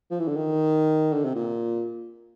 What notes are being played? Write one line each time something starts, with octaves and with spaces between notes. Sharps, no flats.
F3
E3
D3
D#3
D3
C3
A#2